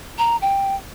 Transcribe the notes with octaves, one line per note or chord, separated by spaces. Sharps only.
A#5
G5